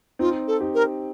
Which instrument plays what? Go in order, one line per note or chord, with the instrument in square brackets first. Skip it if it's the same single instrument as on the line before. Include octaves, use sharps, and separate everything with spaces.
[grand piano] C4 D#4 [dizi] F4
[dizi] A4
[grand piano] D#4 G4
[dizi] A#4